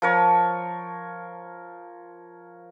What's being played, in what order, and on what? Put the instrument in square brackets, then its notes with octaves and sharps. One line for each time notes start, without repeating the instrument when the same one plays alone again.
[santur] F3 A#4 C#5